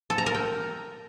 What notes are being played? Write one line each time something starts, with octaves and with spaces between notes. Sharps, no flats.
A4
A#5
A#4
G5